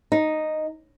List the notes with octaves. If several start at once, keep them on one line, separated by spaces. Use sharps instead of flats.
D#4